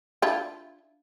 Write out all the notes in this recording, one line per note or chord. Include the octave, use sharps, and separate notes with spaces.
D4 E4 F4